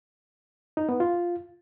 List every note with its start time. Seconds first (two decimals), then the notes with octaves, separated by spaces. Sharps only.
0.77 D#4
0.89 B3
1.00 F4